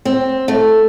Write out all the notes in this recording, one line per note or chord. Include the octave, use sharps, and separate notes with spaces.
C4
A3